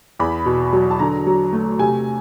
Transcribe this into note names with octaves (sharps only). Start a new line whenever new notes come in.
E2 B5
B2
F#3
A5
D3 A#5
F#3
A3
C3 G#5